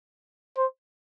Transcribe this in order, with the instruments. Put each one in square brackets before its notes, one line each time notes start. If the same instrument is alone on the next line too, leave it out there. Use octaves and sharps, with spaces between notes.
[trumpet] C5